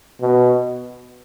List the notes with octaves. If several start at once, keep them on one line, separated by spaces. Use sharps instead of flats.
B2